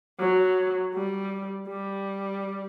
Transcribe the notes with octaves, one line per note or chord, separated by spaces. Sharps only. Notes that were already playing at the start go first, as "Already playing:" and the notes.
F#3
G3
G3